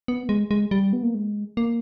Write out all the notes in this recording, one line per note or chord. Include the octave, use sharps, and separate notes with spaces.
B3
G#3
G#3
G3
B3
A#3
G#3
A#3